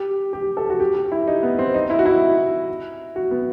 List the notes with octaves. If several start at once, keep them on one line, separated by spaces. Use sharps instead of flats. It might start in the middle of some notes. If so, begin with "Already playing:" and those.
Already playing: G4
G4
A4
F#4
G4
G4
E4
D#4
B3
C4
D#4
E4
F#4
E4
F#4
B3